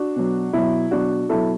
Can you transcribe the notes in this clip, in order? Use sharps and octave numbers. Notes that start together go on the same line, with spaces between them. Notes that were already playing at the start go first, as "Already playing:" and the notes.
Already playing: D4 F#4
B2 F#3
B2 F#3 E4
B2 F#3 D4 F#4
B2 F#3 E4 A4